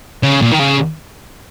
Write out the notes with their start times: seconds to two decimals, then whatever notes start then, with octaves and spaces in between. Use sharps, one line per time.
0.23 C#3
0.42 A#2
0.51 D#3
0.59 C#3